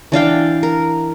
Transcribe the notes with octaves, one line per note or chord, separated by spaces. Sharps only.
E3 D4 F5 G5
A#4